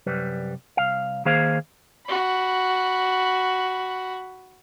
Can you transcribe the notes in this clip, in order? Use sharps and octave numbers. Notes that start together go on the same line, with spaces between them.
C2 F#2 G3 B4
C2 F5
D#3 A#3 G#4 C5 F5
F#4 B5